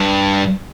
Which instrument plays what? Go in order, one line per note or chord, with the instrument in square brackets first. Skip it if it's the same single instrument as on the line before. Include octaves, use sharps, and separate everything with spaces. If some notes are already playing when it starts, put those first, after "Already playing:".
Already playing: [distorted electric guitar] G2